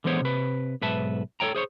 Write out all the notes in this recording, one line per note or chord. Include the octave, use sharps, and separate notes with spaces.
D3 E3 G#3 B3 C5 C#5
C3 B4
B1 G#2 B4 E5 A5
A4 C5 C#5 G5 A#5
G#4 C5 C#5